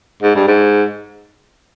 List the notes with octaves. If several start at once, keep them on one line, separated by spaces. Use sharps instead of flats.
G#2
G2
G#2